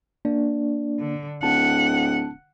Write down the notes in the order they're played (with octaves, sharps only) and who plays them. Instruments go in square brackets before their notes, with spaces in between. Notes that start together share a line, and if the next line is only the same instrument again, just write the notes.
[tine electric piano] A#3 D4 D5
[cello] D3
[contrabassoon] D1 [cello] F#5 [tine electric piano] A5